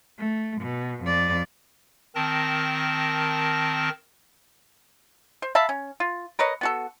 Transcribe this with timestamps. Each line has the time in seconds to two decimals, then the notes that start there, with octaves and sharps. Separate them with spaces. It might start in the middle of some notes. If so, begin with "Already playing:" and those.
0.19 A3
0.62 B2
1.03 F2 D5
2.15 D#3 C4 A#4 A5 A#6
5.42 C5
5.55 E5 F5 A5 B5
5.69 C#4
6.00 F4
6.39 A#4 B4 C#5 D#5
6.61 B3 F#4 A4